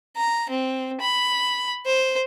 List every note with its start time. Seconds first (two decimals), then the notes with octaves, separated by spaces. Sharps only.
0.17 A#5
0.50 C4
1.01 B5
1.86 C5